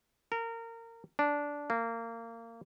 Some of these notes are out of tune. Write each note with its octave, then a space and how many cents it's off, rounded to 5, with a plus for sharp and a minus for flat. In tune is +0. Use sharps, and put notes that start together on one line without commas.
A#4 -25
D4 -10
A#3 -25